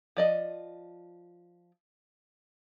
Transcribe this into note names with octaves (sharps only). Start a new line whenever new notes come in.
F3 D5 D#5